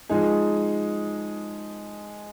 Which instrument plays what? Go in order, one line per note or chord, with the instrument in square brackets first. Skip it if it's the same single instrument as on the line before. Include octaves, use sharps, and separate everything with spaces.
[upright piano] F3 G#3 D#4 G#4